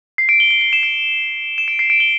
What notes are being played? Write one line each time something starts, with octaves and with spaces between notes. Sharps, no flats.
C7
D7
G7
G7
G7
E7
D7
E7
D7
C7
D7
G7